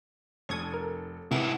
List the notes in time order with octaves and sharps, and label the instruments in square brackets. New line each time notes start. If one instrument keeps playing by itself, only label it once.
[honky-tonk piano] F1 A4 [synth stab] C#6 D#6 G#6
[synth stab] A#4
[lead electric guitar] G#2 E4 [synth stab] C3 D6 E7 [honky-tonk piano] A#4 B4 F#5